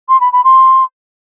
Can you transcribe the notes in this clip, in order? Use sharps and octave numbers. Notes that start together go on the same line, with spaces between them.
C6
B5
B5
C6